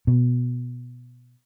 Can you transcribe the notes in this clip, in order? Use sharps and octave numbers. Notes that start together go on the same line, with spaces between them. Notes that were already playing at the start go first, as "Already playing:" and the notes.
B2